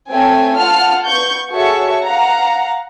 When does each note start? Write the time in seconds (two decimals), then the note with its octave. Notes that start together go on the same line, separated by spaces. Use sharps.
0.11 A3 C4 C#5 G5 G#5
0.58 F4 F#5 A5 F6
1.08 B3 C#6 G6
1.54 F#4 G#4 A4 C#5 E5 C#6
2.04 F5 F#5 A#5